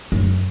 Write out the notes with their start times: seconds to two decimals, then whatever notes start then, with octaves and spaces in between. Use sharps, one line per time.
0.12 F#2